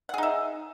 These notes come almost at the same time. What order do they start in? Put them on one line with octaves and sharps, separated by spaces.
F#5 G#4 D#4 E5